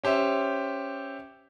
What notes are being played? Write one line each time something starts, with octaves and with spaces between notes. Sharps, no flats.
C#4 G4 C5 E5